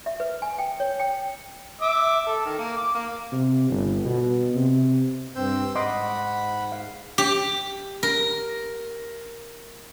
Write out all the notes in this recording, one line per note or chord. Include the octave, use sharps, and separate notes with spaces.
E5
B4
G#5
G5
C#5
G5
E5 D6
A4
D#3
A#3
D6
A#3
C3
G1
B2
C3
G2 C4 C5 E6 G6
G#2 D#5 F#5 B5 C6 D6
F5
G4
A#4